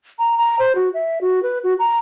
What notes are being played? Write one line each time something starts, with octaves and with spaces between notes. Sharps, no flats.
A#5
A#5
C5
F#4
E5
F#4
B4
F#4
A#5